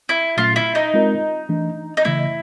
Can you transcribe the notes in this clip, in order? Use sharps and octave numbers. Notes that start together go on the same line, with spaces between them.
E4
A#2 F#3 A3 C#4 F4
E4
D#4
G#3 C4 F4 A#4
E3 A3 D4
D#4
C#3 E3 A3 E4